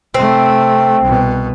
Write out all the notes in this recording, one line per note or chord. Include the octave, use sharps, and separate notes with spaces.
C3 A3 C4
C2 B2